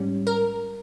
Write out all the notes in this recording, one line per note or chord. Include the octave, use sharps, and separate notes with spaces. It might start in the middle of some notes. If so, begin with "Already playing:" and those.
Already playing: G#2 G3 C#4
A#4